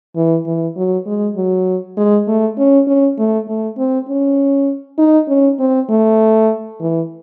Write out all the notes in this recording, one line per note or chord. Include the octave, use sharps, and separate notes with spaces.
E3
E3
F#3
G#3
F#3
G#3
A3
C#4
C#4
A3
A3
C4
C#4
D#4
C#4
C4
A3
E3